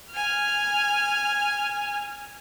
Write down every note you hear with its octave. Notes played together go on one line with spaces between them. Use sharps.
G#5 F6